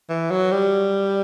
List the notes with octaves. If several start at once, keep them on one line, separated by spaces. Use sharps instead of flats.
E3
F#3
G3